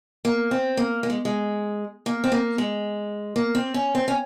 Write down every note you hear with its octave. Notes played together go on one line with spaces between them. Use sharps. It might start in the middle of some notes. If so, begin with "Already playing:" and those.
A#3
C4
A#3
A#3
G#3
G#3
A#3
C4
A#3
G#3
A#3
C4
C#4
C4
C#4